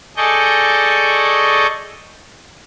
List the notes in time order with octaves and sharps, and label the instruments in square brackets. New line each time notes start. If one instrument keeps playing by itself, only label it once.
[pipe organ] G#4 A4 D5 D#5 C#6 G6